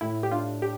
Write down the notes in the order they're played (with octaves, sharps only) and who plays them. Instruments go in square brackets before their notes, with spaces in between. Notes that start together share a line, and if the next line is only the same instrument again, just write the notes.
[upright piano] A2 [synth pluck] E4
[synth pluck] G4
[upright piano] D4 [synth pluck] F4
[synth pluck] G4